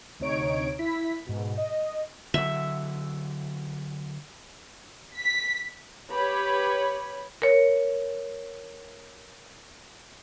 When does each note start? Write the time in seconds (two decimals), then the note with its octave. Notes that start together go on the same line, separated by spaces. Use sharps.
0.20 D2 C3 D#4 C#5 D7
0.79 E4 B6
1.26 G#2 B2
1.58 D#5
2.34 D3 F#3 E5
5.17 B6
6.10 G4 B4 C#5 B5
7.42 A#4 C#5